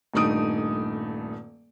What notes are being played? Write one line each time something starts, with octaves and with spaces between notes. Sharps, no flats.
D#1 G2 A3 D#4 D#6 D7